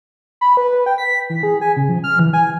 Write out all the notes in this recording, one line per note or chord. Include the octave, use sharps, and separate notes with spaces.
B5
B4
G5
B6
E3
G#4
G#5
C#3
F3
F6
E3
G#5